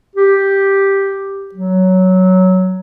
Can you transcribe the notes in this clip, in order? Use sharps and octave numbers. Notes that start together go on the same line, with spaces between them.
G4
F#3